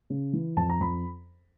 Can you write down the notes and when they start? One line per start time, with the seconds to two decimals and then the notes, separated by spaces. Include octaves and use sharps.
0.10 C#3
0.33 E3
0.57 F2 A5
0.69 A#5
0.81 F2 B5